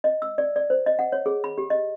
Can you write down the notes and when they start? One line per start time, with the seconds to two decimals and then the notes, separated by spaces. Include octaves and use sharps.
0.04 D#5
0.22 E6
0.38 D5
0.56 D5
0.70 C5
0.86 D#5
0.99 F#5
1.12 C#5
1.26 G#4
1.44 B5
1.58 G4
1.70 D#5